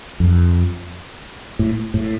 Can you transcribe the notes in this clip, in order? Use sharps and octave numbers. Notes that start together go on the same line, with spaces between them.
F2
A2
A2